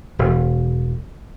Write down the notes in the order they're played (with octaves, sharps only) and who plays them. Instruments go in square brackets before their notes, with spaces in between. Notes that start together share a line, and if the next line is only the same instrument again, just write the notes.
[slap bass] E1